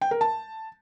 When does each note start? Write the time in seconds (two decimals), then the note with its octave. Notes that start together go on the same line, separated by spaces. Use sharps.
0.01 G5
0.11 A#4
0.21 A5